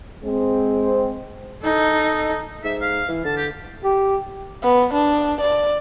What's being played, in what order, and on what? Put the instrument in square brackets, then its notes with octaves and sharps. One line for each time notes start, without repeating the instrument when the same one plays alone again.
[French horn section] G#3 C4
[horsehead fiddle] D#4 A4
[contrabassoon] G#2 [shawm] E5
[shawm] F5
[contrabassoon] E3
[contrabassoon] D3 [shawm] A5
[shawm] G4
[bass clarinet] G4
[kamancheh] B3
D4
D5